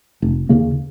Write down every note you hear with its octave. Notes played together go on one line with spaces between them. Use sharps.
F1
D#2 C#3 A#3